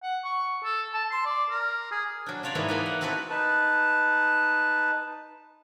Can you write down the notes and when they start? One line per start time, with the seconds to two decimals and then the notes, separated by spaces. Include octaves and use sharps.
0.03 F#5
0.25 C#6
0.64 A4
0.94 A5
1.11 C6
1.25 D5
1.50 A#4
1.92 G#4
2.26 F#3 D4
2.43 C#4 F4 C#5 D5 F5
2.55 G#2 E3 A#3 B3 E4
2.68 A#3 D#4 B4
2.86 F#5
3.01 C4 E4 F#4 A4 B4
3.30 D#4 B4 A5